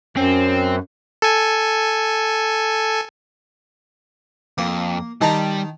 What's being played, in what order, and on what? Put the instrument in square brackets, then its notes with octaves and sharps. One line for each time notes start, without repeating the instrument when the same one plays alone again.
[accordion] F#2 [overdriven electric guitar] C4 [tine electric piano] C#4
[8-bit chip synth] A4 G#5
[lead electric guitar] F2 [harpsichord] A#3
[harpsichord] D#3 A5 A#5 [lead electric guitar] G3